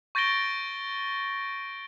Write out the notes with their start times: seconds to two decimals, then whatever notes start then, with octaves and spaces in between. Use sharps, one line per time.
0.15 C#6 G6 A6 A#6 D7 G7